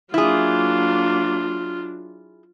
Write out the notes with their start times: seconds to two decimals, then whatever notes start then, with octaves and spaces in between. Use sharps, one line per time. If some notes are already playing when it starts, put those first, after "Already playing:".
0.14 F#3 A#3 D4 E4 F4 G#4